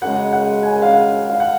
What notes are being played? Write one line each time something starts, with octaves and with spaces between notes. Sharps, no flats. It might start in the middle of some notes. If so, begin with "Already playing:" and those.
F#2 C#3 G#3 F#5
F#5
G#5
F5
F#5
F5
F#5